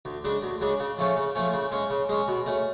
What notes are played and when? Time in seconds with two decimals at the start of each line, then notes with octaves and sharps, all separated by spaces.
0.05 D2
0.24 C#3 G#3 D4
0.42 D2
0.61 C#3 G#3 D4
0.80 C#3
0.98 F3 A3 C#4
1.16 C#3
1.35 F3 A3 C#4
1.53 C#3
1.72 G#3 C#4
1.90 C#3
2.09 G#3 C#4
2.28 B2
2.46 A3 C#4